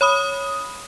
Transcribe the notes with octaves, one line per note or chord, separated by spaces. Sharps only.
C#5 B5 D#6